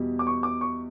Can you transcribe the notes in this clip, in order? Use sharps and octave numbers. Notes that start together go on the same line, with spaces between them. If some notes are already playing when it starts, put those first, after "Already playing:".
Already playing: E2 B2 G3
D6
C#6
D6
C#6